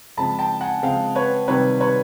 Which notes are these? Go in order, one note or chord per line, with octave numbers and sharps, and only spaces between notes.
C#3 F3 G#3 C4 A5 B5
G5 A5
F#5 G#5
C#3 F3 G#3 C4 F5 G5
B4 C#5
C3 D#3 G3 C4 B4 C#5
B4 C#5